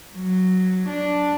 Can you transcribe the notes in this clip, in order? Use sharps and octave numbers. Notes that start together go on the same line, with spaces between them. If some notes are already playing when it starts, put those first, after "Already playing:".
F#3
D4